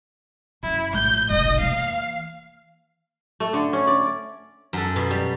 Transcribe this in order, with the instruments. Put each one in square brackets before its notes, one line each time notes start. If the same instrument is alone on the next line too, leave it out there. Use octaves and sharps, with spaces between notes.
[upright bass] F#2 [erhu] E4
[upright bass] A#1 A2 [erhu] G6
[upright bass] F1 B1 [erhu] D#5
[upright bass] E3 A#3 [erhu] F5
[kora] A3
D3
C#4
D5
[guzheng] F#2 A4
B2
G3